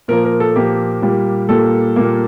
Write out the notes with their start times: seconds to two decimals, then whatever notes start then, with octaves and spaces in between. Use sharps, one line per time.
0.08 A#2 F3 A#3 A#4
0.25 A#4
0.40 A4
0.56 A#2 F3 A#3 G4
1.02 A#2 G3 A#3
1.49 A#2 G3 A#3 A4
1.96 A#2 G3 A#3